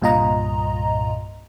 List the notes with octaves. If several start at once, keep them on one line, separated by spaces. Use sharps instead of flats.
C2 G2 A#2 F4 D#5 A#5